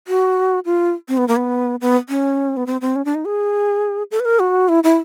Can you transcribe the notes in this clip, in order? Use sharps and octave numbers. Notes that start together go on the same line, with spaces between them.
F#4
F4
C4
B3
A#3
B3
B3
C#4
B3
C4
C4
C#4
D4
D#4
G#4
A4
B4
A#4
F#4
E4
E4